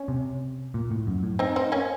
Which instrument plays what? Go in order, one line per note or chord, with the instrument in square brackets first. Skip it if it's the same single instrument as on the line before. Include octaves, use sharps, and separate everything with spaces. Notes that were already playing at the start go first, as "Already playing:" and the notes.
Already playing: [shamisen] C#4
[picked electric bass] C3
A#2
A2
F#2
A2
[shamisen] C4 D#4
C4 D#4
A#3 C#4